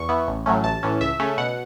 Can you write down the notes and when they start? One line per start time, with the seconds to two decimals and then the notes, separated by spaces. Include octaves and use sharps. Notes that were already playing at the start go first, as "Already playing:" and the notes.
Already playing: E2 C#6
0.09 E3 B3
0.28 A1
0.46 A2 F#3 A3 C#4
0.64 A1 A5
0.83 A2 E3 C#4
1.01 C#2 E5
1.20 C#3 A3 C#4
1.38 B2 F#5